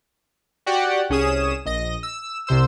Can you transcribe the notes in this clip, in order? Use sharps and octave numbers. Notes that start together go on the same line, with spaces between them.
F#4 G4 D5 F#5 G5
C2 C#4 G#4 D#6 E7
A#1 D#5 A#6
E6
C2 C3 C5 E6